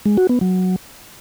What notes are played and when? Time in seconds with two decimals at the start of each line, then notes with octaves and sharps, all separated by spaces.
0.06 G#3
0.17 F#4
0.29 B3
0.41 F#3